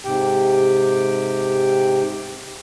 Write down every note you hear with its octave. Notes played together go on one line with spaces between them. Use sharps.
G#2 C3 G4 G5